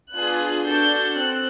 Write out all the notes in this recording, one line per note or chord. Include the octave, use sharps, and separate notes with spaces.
B3 D4 F4 G#4 F#6
D4 F#4 A4 G6
C4 F#6